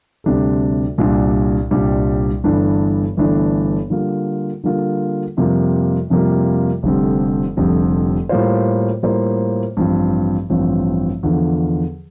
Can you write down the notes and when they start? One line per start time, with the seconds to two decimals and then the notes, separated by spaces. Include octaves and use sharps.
0.24 D2 C3 G3 D4 A4
0.98 C2 A#2 G3 D4
1.71 C2 A#2 G3 D4
2.44 G1 G2 E3 A3 D4
3.17 G1 G2 E3 A3 D4
3.90 D3 G3 A#3 F4
4.64 D3 G3 A#3 F4
5.37 F2 C3 G3 A#3 F4
6.10 F2 C3 G3 A#3 F4
6.83 F1 F2 D3 G3 C4
7.57 F1 F2 D3 G3 C4
8.29 A2 G3 A#3 F4 C5
9.03 A2 G3 A#3 F4 C5
9.76 A1 G2 F3 C4
10.50 A1 G2 F3 C4
11.23 E2 D3 F3